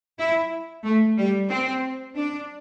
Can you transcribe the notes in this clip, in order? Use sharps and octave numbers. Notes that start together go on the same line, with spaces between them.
E4
A3
G3
C4
D4